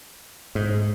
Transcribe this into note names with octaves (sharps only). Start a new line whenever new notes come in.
G#2